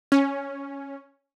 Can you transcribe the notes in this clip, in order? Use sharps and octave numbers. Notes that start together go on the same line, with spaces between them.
C#4